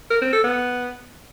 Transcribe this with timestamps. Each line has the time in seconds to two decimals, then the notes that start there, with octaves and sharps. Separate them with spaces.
0.10 A#4
0.22 C4
0.33 A4
0.44 B3